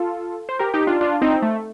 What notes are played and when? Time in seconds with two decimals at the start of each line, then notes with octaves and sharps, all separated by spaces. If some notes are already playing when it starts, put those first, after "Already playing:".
Already playing: F4 A4
0.49 C5
0.59 G4 A#4
0.74 D#4 G4
0.87 D4 F4
1.01 D4 F4
1.22 C4 D#4
1.42 A3